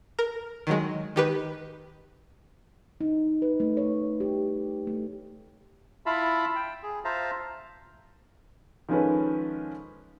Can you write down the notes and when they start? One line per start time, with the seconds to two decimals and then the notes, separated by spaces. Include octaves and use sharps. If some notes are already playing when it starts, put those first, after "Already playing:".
0.19 A#4
0.67 D#3 F#3 G#3
1.16 D#3 G4 B4
3.01 D#4
3.42 B4
3.60 A3
3.77 C#5
4.20 G4
4.87 A3
6.06 E4 F4 E5 F5 A5 B5
6.56 G5
6.83 G#4
7.05 F4 C5 E5 F5 A5 A#5
8.89 D#3 F3 G#3 C#4 A4 B4